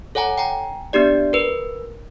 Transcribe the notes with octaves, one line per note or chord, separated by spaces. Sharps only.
A4 C#5 F#5 G#5 A#5
G5 G#5 A#5
B3 D4 G4 D5
A#4 B4